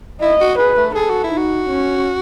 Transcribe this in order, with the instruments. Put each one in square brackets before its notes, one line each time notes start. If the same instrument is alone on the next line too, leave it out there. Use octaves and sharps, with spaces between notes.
[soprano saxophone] E4 [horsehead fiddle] D#5
[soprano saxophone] F#4
[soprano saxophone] G#4 [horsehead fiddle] B4
[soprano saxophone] A3
[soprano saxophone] G#4 [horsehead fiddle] A4
[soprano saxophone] F#4
E4
[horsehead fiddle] D#4
[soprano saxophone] F#4
[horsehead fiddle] C#4